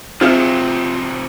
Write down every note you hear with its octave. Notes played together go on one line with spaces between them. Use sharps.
C3 F3 F#3 C4 F4 G#4 E5